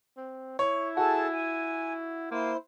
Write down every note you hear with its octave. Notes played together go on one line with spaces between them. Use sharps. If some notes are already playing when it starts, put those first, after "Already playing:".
C4
E4 C#5
F#4 G#4 A4 A5
G#5
A#3 E4 C5